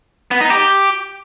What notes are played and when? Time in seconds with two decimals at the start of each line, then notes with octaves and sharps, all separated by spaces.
0.31 B3
0.41 D#4
0.50 G4